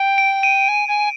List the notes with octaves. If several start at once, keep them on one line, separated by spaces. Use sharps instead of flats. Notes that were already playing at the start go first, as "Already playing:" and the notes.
Already playing: G5
D7
D#7
G#5
G#5